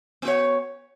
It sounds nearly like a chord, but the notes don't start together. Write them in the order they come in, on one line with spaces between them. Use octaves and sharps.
B3 F#4 C#5